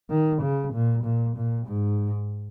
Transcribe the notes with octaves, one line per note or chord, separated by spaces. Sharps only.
D#3
C#3
A#2
A#2
A#2
G#2